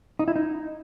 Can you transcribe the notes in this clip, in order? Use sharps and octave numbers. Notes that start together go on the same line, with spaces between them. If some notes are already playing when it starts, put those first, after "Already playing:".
D#4
E4
D#4